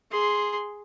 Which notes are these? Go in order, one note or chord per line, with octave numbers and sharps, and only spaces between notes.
G#4 C6